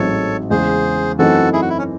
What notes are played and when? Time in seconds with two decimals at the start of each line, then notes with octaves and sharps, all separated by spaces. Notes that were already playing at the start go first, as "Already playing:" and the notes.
Already playing: A1 G#2 F#3 C4 D#4 A4 C#5
0.50 E2 C#3 G#3 G#4 C5
1.19 F#2 E3 A3 C4 D#4 F#4 A4
1.53 E4 G#4
1.62 F#4
1.70 E4
1.79 C#4